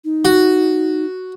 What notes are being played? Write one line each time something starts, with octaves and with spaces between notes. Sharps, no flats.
D#4
F#4